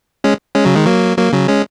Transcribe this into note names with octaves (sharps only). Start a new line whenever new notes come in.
G#3 C#4
G#3 C#4
C#3 F#3
D#3 G#3
F#3 A#3
F#3 A#3
C#3 F#3
G#3 C#4